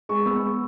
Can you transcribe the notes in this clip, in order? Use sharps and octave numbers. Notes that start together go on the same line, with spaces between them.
G#3 C#6
B3 E6